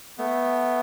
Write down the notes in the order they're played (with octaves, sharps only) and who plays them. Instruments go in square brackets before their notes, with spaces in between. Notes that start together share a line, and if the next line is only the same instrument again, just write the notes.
[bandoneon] A3 B3